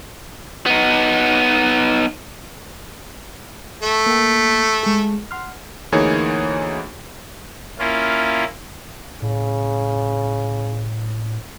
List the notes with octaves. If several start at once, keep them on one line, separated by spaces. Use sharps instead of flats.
B3 D#4
A3
A#3 G5
G#3 G#4
F#5 C6 F6
D2 E3 A#3 D#4 G#4 C#5
A#3 C#4 E4 F4
A2 C#3